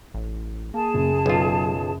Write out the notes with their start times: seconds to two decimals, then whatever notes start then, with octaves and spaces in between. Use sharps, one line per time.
0.14 A1
0.74 A#3 G#4 A5
0.94 F#1
1.26 B1 F#3 F4